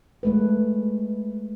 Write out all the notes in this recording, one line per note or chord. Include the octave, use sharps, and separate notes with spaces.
G#3 A3 B4